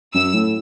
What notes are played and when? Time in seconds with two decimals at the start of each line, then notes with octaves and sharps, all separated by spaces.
0.14 F#2 E6
0.34 A2